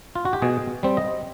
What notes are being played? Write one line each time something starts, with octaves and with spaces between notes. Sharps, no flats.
F4
F#4
G4
B2 G#4
G3 C4
D#5